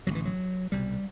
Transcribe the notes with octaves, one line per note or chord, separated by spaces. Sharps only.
A1 G2 D3 E3 F#3
F#3
C2 B2 G3